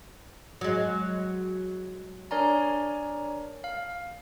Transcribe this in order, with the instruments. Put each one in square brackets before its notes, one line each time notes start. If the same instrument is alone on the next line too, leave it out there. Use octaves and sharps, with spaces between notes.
[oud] F#3 G#3
[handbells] D4 A#4 C#5 D5 G#5 A#5
F5